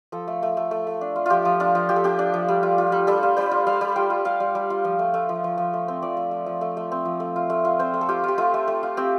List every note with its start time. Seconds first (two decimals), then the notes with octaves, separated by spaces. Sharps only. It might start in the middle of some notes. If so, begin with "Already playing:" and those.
0.12 F3 A4
0.28 A3
0.43 A3
0.57 A3
0.71 A3
0.87 A3
1.01 D4
1.16 F4
1.26 F3 F4 G4
1.45 F3
1.60 D4 F4
1.75 F3
1.89 F3 G4
1.96 A4
2.04 D4 G4
2.19 D4
2.34 F3
2.48 G3
2.63 F4
2.78 F4
2.92 G3
3.07 G3 A4
3.23 F4
3.37 G3 C5
3.51 F4
3.67 G3 F5
3.81 G3
3.96 F4 G5
4.10 F4
4.25 G3 F5
4.40 G3
4.55 G3
4.70 F4
4.84 F3
4.99 A3
5.14 A3
5.29 F3
5.44 F3
5.58 F3
5.74 A3
5.88 C4
6.02 F3 D5
6.17 A3
6.31 A3
6.46 F3
6.61 A3
6.77 A3
6.92 C4
7.05 F3
7.20 A3
7.36 F4
7.50 A3
7.65 F4
7.79 C4 C5
7.94 A3
8.01 A4
8.09 F4 G4
8.24 F4 G4
8.38 A3 F4
8.54 A3
8.68 A3
8.83 F4
8.97 C4 G4